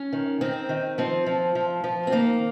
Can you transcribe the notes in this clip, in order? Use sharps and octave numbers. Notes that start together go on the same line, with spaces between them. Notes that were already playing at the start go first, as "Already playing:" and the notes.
Already playing: C#4
D#3
D#3 C4
D#3
F3 C4
F3
F3
F3
C4
D#3 A#3